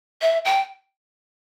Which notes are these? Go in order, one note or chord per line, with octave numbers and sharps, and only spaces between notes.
E5
G5